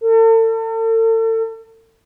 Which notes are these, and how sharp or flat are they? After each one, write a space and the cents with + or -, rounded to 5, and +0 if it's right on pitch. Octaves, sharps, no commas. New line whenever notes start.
A4 +40